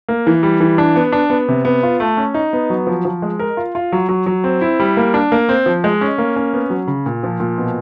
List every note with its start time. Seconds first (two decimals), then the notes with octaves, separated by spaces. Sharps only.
0.08 A#3
0.27 E3
0.43 G3
0.60 E3
0.78 D4
0.96 B3
1.12 D4
1.30 B3
1.49 C3
1.65 B3
1.83 F4
2.00 A3
2.17 C#4
2.34 D#4
2.53 B3
2.70 F#3
2.87 F3
3.05 F3
3.22 G#3
3.39 A#4
3.57 F4
3.75 F4
3.92 F#3
4.09 F#3
4.26 F#3
4.44 C4
4.61 E4
4.80 G3
4.97 A#3
5.14 D4
5.32 A#3
5.49 C4
5.66 F3
5.84 G#3
6.01 C#4
6.18 A#3
6.36 C#4
6.53 B3
6.70 F#3
6.87 C#3
7.06 A#2
7.23 F3
7.40 A#2
7.58 B2